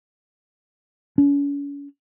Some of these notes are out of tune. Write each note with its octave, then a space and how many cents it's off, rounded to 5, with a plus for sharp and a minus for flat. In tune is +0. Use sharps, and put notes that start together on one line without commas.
C#4 +40